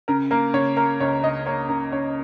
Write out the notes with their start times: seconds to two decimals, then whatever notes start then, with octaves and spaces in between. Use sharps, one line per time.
0.08 C#3 A#4
0.31 A#3 A#4
0.54 C#3 C#5
0.77 A#3 A#4
1.00 C#2 C#5
1.24 C#2 D#5
1.46 A#3 C#5
1.69 C#3 A#4
1.92 C#3 C#5